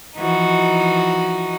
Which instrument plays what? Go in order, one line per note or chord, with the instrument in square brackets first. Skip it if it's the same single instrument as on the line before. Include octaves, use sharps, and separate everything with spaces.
[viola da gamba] E3 F3 [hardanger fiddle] D#4 F#4